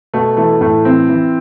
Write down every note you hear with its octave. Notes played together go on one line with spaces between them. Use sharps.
B2 A3
E3 A3
A2 A3
E3 C4
E3